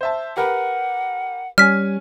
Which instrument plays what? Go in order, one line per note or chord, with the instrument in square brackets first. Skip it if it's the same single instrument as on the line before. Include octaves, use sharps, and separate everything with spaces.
[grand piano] C5 E5 A5
[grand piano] G4 A#4 B4 [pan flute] F#5
[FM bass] G3 [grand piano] C#4 G#5 [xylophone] F6 B6